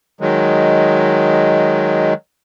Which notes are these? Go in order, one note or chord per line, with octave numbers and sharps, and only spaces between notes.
D#3 F#3 G#3